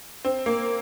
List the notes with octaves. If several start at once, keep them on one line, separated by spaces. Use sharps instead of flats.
C4
A#3